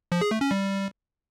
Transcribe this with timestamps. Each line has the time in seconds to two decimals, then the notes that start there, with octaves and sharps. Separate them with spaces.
0.12 F3
0.21 G#4
0.31 A3
0.41 C#4
0.51 G3